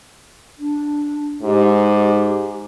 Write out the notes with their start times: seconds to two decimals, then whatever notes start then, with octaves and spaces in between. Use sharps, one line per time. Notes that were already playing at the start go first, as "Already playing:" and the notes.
0.59 D4
1.42 G#2 G4